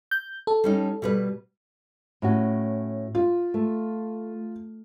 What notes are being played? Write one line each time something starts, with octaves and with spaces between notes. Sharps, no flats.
G6
A4
G3 C#4 D#4
B2 G3 B4
A2 C#4 F#4
F4
A3